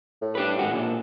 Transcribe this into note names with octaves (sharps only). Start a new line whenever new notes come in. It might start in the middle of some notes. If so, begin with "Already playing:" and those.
A2
D4 G4 B4
G#2 F#4
A#2 D4